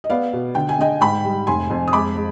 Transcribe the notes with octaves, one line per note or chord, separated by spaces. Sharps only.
D#5
B3 D5 F5
B2
D3 G5
G#5
D3 D#5 G5
G#2 G5 B5
G3
F1 G#5 C6
F2
D#6
G#3 B5 D6
G#3